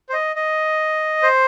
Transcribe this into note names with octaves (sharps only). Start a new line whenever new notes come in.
C5
D#5
D#5
C5